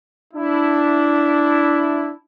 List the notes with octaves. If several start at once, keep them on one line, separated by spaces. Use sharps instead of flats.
D4 E4